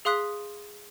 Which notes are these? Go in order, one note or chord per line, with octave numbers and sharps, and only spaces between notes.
G#4 F5 C6 D#6 F#6 B6